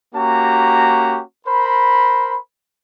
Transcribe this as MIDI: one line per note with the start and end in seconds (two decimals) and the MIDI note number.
0.15 1.22 58
0.15 1.22 61
0.15 1.22 66
0.15 1.22 67
0.15 1.22 82
1.47 2.37 70
1.47 2.37 72
1.47 2.37 83